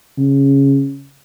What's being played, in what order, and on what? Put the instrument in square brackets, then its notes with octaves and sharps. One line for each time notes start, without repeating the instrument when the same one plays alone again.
[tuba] C#3